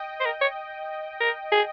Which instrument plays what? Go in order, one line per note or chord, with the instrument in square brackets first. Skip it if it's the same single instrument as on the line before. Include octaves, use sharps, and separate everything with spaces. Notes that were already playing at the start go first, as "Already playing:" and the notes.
Already playing: [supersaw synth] D#5 G5
[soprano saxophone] C5
A#4
C#5
A#4
G#4